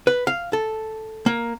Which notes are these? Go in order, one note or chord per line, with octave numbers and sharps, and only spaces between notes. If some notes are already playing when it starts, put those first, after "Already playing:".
B4
F5
A4
A#3